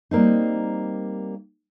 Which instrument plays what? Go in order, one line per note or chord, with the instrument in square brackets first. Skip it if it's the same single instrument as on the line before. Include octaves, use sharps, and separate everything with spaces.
[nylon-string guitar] G3 A#3 C4 D#4